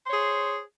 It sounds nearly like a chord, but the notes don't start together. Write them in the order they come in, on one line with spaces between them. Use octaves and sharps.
C5 C#5 G#4